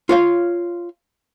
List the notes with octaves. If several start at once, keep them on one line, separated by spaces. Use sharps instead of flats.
F4 C#5 F5